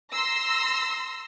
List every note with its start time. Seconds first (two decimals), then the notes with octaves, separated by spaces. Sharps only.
0.12 A#5 C6 E6 A#6